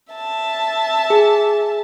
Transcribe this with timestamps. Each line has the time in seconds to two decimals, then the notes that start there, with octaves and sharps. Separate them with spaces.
0.14 E5 A5
1.10 G#4